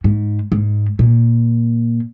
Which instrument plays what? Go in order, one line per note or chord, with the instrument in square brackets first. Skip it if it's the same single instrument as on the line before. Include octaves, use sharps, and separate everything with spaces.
[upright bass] G#2
G#2
A#2